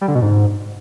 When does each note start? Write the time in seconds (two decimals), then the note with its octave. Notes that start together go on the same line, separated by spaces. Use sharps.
0.01 G3
0.08 D3
0.15 B2
0.22 G#2